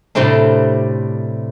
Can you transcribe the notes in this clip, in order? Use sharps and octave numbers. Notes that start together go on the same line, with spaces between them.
A2 C3 G3 A3 C4 D4